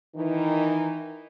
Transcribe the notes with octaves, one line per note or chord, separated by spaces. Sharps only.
D#3 E3 D#4